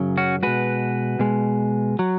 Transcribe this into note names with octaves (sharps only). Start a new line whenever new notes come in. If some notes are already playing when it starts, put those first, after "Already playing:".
Already playing: F#2 C#3 F#3
C#4 F#4
B2 G#3 F#4 B4
B2 G#3
F#3